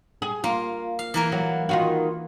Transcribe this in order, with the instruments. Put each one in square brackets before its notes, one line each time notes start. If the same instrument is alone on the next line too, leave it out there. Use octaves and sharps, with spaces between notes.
[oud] G#4
[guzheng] A#3 [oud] F4
[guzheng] F5
E3 A#3 A#4
[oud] F#3
D#3 F4 F#4